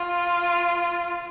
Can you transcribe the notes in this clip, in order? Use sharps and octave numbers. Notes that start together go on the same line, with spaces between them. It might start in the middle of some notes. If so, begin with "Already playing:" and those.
Already playing: F4